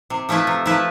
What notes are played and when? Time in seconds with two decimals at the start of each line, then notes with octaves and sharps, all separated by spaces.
0.10 C3
0.29 F3 A3 E4 B4
0.47 C3
0.66 F3 A3 E4 B4